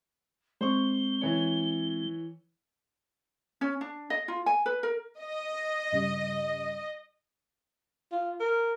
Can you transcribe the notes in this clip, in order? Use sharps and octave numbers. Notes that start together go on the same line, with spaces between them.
G#3 C4 C5 C#6 G7
E3 C#5
C#4
D4
D#5
F4
G#5
B4
A#4
D#5
G2 C#3 G3
F4
A#4